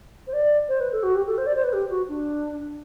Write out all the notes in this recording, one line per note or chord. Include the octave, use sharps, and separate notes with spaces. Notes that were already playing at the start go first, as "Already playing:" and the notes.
C5
D5
C5
B4
A4
F#4
G4
A4
C5
D5
C5
B4
G4
F#4
D4